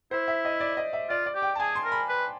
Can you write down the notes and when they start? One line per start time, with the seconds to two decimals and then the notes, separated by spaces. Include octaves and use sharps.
0.11 E4 C5
0.28 E5
0.45 D#5
0.60 D5
0.77 D#5
0.93 E5
1.10 F4 D5
1.26 D5
1.35 G4
1.42 G5
1.55 A5
1.60 G#4 G#5
1.75 C6
1.85 A#4
1.92 B5
2.09 B4